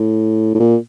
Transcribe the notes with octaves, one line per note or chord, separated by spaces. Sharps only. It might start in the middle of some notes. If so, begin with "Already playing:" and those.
Already playing: A2
A2
A#2